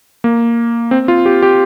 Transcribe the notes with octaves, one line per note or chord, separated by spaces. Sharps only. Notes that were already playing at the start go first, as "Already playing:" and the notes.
A#3
C4
F4
G4
G4